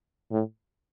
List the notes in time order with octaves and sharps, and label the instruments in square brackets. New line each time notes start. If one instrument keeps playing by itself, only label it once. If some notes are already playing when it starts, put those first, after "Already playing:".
[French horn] A2